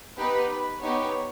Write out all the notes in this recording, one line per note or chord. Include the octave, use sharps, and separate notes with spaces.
B3 D#4 G4 B4
B4
B3 D#4 G4 C#5